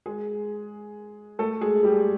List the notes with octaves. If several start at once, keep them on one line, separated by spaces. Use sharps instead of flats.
G#3 G#4
A3 A4
G#3 G#4
G3 G4